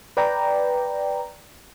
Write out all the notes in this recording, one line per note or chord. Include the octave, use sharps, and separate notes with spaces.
B4 D5 G5 A#5